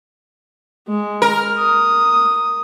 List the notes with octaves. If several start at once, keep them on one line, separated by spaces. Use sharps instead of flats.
G#3
A#4
D#6